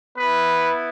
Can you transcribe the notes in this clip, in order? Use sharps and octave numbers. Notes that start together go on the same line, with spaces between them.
B3 E4 B4